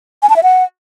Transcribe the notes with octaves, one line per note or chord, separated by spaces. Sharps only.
G#5
A5
E5
F#5